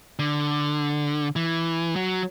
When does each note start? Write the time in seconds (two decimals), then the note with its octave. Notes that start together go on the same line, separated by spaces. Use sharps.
0.19 D3
1.36 E3
1.96 F#3